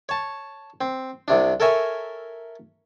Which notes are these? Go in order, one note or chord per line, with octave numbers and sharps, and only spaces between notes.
C#5 A5
C4
C2 C3 D4
A4 A#4 C#5 E5 G#5